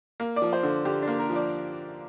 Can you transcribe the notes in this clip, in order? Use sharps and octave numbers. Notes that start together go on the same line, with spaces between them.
A#3
D5
F3
C5
D3
D3 G4
D4
A#3
A#4
F3
D5